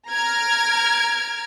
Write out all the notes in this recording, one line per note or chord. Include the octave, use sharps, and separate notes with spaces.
A#5 F6 G#6 D7